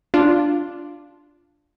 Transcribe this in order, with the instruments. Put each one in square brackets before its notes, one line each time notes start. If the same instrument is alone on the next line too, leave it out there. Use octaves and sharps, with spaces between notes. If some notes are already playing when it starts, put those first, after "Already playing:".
[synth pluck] D4 F4